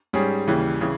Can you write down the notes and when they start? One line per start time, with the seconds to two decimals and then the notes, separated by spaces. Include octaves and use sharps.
0.13 G#2 G3 C#4 G#4
0.47 D#2 C#3 E3 G3
0.81 C#3 E3